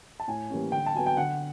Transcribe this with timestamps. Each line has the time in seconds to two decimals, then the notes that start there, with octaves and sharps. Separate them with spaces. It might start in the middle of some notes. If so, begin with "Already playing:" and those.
0.20 A5
0.28 A2 G#5
0.50 E3 G3 A#3 C#4
0.72 D3 G5
0.86 A5
0.94 F#3 B3 G#5
1.06 G5
1.17 D3 F#5